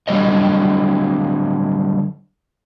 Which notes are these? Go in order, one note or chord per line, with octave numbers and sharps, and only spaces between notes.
D3 F#3 G3 C#5 D#5